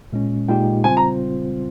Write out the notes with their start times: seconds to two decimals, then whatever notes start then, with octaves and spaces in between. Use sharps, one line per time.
0.13 A#2 G#3 C#4
0.48 A#2 G#3 D#4 G4 G5
0.84 C#3 G3 C4 F4 C5 G#5
0.97 A#5